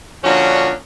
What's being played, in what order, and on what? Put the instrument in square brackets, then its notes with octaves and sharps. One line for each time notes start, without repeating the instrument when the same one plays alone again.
[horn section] A#2 D3 F3 C#4 D4 F#4